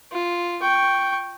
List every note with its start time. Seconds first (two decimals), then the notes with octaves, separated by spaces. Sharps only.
0.12 F4
0.62 G5 C#6